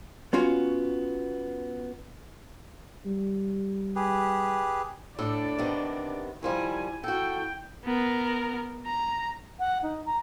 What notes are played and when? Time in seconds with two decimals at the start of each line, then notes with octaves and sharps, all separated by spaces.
0.33 B3 C#4 F4 F#4
3.06 G3
3.96 G4 G#4 B4
5.19 A2 D4 A4 D5
5.59 C3 D#3 B3
6.43 D#3 F3 G3 E4 G#5
7.04 E4 F#4 A4 G5
7.85 B3 A#4
8.86 A#5
9.59 F#5
9.83 D#4
10.06 A#5